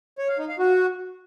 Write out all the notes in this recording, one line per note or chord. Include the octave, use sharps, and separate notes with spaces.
C#5
F5
D#4
F5
F#4